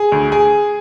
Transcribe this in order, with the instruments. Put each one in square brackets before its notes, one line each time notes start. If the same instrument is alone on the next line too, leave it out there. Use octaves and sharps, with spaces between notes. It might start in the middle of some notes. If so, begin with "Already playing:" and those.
Already playing: [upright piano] G#4
D2
G#4